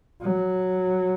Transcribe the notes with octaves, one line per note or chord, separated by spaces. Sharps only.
F#3